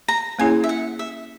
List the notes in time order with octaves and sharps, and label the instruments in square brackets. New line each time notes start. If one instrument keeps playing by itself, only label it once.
[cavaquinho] A#5
[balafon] A#3 C#4 E4 G#4 C#5 [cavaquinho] G#5
[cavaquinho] E5
F#5
E5